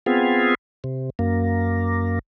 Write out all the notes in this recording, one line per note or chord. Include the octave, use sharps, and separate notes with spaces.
B3 C4 F4 G#4
C3
F#2 A#3